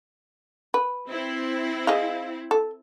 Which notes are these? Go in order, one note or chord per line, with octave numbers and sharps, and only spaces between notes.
B4
C4 E4
G#4 D#5 F5
A4